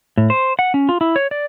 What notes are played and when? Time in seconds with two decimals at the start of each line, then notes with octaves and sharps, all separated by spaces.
0.17 A2
0.30 C5
0.59 F#5
0.74 C#4
0.89 F4
1.01 E4
1.16 C#5
1.31 D5